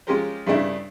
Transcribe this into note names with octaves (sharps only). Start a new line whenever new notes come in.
G#3 C#4 F4 G4 A#4 C5
G2 C#3 A3 D4 E4